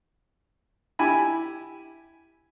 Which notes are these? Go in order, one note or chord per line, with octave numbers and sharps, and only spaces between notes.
E4 G4 G#5 B5